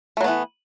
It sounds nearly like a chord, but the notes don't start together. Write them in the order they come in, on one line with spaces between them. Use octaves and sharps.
A3 F#3 B3 E3